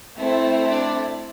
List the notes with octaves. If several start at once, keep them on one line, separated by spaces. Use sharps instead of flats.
A3 C4 E4 A4
D4 D5